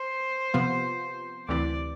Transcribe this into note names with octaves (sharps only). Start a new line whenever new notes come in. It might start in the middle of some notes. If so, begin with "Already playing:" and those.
Already playing: C5
C3 F3 B3 F4
D2 C3 E3 D5